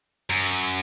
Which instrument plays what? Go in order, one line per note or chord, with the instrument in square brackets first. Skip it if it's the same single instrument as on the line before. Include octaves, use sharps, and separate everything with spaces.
[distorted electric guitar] F#2